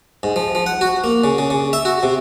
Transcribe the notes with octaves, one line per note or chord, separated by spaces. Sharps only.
G#2
F3
F3
F#5
F#4
A#3
C#3
C#3
C#3
E5
F#4
C3